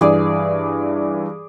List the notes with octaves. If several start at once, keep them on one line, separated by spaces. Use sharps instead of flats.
G2 E3 G#4 D5